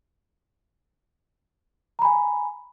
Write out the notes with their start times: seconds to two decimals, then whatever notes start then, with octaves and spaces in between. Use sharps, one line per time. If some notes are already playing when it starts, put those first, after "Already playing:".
1.99 A#5
2.02 B5
2.05 G#5